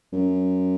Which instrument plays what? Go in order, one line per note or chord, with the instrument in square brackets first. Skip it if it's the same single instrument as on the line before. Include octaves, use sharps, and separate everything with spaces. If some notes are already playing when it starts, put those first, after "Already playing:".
[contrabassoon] F#2